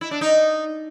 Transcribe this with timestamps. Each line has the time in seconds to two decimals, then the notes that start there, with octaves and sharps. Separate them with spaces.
0.01 E4
0.11 D4
0.21 D#4